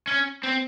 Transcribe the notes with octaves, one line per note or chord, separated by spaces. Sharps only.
C#4
C4